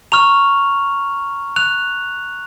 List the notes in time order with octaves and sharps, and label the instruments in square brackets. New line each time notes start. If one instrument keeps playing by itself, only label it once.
[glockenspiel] A#5 C#6 F6 F7
F#6 F7